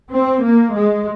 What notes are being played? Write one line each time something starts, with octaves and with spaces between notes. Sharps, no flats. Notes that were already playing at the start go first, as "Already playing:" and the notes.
C4
A#3
G#3